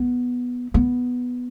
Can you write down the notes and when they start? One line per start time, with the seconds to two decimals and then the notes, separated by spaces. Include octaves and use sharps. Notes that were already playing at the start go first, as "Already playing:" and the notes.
Already playing: B3
0.74 B3